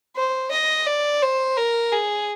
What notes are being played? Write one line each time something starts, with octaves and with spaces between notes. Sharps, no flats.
C5
D#5
D5
C5
A#4
G#4